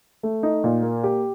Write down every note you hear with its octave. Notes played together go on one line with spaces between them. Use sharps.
A3
D#4
A#2
A#3
G4